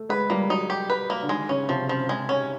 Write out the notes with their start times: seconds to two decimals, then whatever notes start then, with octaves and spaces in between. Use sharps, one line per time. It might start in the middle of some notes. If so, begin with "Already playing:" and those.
Already playing: A3
0.09 G#3 B4
0.30 G3 A#3
0.49 F#3 D#4
0.70 G4
0.90 B4
1.10 A#3
1.23 D3
1.29 D#3 G#3
1.49 C#3 C#4
1.69 C3 F3
1.88 C#3 F3
2.09 G#3
2.29 C#4